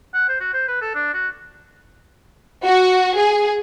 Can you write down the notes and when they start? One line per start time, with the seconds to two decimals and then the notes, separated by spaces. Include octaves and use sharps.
0.14 F#5
0.29 C5
0.40 F#4
0.54 C5
0.68 B4
0.81 A4
0.95 D4
1.14 F#4
2.65 F#4
3.16 G#4